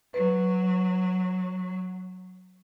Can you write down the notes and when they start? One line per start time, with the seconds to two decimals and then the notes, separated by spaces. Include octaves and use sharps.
0.14 F#3 B4